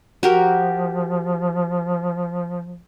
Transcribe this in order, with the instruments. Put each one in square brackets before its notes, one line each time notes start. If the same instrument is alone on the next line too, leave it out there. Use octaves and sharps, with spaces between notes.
[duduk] F3 [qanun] F#4 G4 A#4